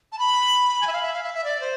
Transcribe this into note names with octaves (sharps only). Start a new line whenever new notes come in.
A5
B5
G#5
E5
F5
E5
F5
E5
E5
D5
C5